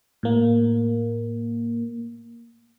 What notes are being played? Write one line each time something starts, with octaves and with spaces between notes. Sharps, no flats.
A2 A#3